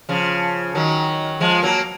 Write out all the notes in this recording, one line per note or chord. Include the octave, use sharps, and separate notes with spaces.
C#3 F3
D#3 F#3
F3 G#3
F#3 A#3